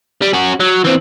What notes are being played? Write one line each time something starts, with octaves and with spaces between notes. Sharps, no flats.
G3
C#4 F#4
F#3
E3 C4